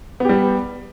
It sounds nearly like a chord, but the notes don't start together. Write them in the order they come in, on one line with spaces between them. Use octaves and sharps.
B3 G4 G3